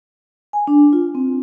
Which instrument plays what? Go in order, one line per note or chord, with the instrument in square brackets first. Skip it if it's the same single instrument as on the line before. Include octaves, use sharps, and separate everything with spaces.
[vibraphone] G#5
D4
F4
C4